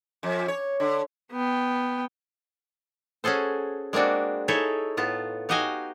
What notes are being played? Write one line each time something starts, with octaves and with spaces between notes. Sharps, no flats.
F2
C#5
D3
B3 G5
C#4 F#4 G#4 A4 C5
G#3 A#3 C4 D4 F#4
D#4 E4 G#4 A4 C#5 E5
A2 B3 F4 A5
D#4 F#4 G4 D#5 F5 G#5